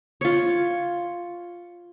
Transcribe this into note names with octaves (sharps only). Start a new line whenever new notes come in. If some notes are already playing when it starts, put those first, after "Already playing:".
F4 C#5